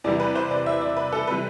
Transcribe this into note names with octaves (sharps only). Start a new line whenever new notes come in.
E2 C3 E3 G3 B3 D5
B4
C5
D5
E5
D5
B4
A4
C3 E3 G3 B4